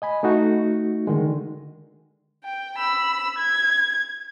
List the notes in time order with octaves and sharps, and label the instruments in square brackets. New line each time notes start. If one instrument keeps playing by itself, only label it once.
[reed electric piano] D#5 G#5 B5
A3 D#4 F#4
D3 D#3 G#3
[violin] G5
B5 E6
G#6